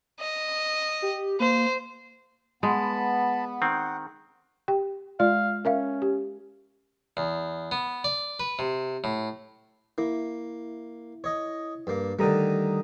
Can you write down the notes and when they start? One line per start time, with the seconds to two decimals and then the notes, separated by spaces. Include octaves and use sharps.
0.20 D#5
1.02 G4
1.40 A#3 C5
2.63 G#3 B3 A5 B5
3.62 D#3 C4 F#5
4.68 G4 G5
5.20 G#3 F4 D5 F5
5.65 C#4 A#4 E5 F5
6.02 G4
7.17 E2
7.71 B3
8.04 D5
8.40 B4
8.59 C3
9.04 A2
9.98 A#3 E4
11.24 C#5 D#5
11.87 G2 A#3
12.19 D3 D#3 G3 A3 A#5 D#6